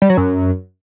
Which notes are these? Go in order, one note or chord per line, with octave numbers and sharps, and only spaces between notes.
G3
F#3
F#2